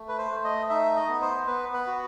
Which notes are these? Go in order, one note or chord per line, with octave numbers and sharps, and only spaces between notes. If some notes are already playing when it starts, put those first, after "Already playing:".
Already playing: A3
B4
C5
A3
D#5
D#4 E5
D#5
B3
C5
B3 B4
B4
F#4